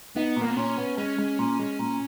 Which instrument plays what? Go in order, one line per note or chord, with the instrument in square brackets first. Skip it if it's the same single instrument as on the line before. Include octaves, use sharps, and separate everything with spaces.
[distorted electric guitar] B3 [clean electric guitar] D#4
[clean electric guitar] A#2
[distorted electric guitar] A#3
B3
[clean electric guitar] A#2 [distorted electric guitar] C#4
[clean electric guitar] B3
[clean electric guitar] G#3 [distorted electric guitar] C#4
[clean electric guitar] G#3
A#2
G#3
A#2